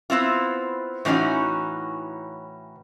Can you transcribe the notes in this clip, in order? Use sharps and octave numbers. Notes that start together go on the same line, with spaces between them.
B3 C4 E4 F4
A2 E3 C#4 D#4 F#4